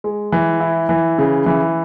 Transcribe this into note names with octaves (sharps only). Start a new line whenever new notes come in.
G#3
E3
E4
E3
C#3
E3